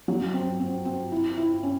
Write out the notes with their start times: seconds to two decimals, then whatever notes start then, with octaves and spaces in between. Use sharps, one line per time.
0.08 F#3
0.34 C4
0.60 C4
0.85 C4
1.12 E4
1.38 E4
1.63 C#4